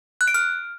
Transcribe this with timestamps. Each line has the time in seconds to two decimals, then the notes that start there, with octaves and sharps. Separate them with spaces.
0.21 F#6
0.28 D7
0.34 F6